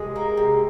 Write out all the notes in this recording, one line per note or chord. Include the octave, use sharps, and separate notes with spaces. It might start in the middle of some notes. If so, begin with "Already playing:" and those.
Already playing: C3 G#3 G#4
A#3
C3